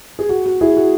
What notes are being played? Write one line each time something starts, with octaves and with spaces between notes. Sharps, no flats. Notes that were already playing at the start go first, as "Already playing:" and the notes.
G#4
F#4
F#4
E4 G#4
F#4